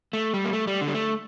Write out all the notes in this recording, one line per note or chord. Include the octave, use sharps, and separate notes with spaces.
A3
G3
A#3
A3
G3
D3
G3
A3